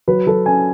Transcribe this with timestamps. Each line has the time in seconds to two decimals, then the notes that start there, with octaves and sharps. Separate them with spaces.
0.08 F#3 B4
0.27 F#3 A4
0.46 C#4 G#5